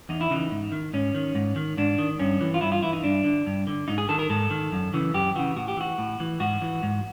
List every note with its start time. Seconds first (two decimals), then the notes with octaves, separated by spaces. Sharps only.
0.09 E2 D#4
0.21 E4
0.30 C#3 E3 D#4
0.51 G#2
0.72 D#3
0.93 G#2 C#4
1.15 D#3
1.35 G#2
1.56 D#3
1.77 G#2 D4
1.98 D#3
2.20 G2 C#4
2.41 E3
2.54 F4
2.61 G2 E4
2.72 F4
2.83 E3 E4
2.93 D#4
3.04 G2 D4
3.24 D3
3.46 G2
3.67 D3
3.88 G#2 D#4
3.98 G#4
4.09 D#3 A4
4.19 A#4
4.30 G#2 A4
4.50 D#3
4.72 F#2
4.94 C#3 E3
5.14 F#2 G4
5.36 C#3 E3 F#4
5.56 A2 F#4
5.68 G4
5.77 E3 F#4
5.98 A2
6.20 E3
6.40 G#2 F#4
6.62 E3
6.83 G#2